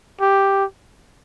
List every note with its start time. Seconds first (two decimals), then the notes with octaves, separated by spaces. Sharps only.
0.20 G4